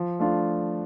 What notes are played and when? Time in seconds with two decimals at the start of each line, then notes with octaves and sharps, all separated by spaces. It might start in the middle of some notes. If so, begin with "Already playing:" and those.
Already playing: F3
0.19 A3 D4 F4